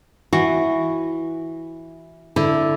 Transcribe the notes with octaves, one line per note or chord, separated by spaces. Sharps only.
E3 F#4
D3 E4